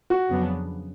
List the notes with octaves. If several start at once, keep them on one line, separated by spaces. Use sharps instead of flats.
F#4
F2 C#3 F#3 B3 D4